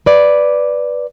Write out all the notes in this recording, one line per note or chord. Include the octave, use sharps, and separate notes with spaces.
B4 D5